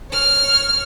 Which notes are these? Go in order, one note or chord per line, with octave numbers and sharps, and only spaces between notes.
C#5 F6